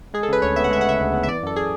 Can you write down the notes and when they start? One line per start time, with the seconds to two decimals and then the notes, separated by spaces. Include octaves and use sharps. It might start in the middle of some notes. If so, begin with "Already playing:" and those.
0.14 G#3 G#4
0.23 A4
0.28 C#3 B4
0.42 D2 C#5
0.56 B3 E5
0.64 F#5
0.70 G#3 E5
0.81 F#5
0.85 C#3 E5
1.00 D2
1.13 B3
1.23 E5
1.27 E3 D5
1.43 F#2 A4
1.56 G#4